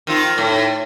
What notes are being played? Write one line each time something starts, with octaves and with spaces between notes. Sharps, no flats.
D#3 C4 F4
A2